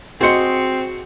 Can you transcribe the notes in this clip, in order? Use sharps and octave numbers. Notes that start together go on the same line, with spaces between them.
C4 F#4 G#4 C5 D#5 C#7